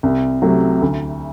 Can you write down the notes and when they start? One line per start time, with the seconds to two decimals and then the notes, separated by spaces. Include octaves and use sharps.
0.03 C2
0.42 C3 F#3 A3
0.82 D2